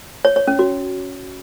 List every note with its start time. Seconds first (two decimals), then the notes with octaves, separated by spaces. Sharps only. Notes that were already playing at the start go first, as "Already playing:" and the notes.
0.25 C#5
0.36 C#5
0.47 C#4
0.59 F#4